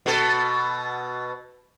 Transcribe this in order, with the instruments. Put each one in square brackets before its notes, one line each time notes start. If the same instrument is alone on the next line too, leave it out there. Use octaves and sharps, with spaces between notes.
[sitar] B2 A4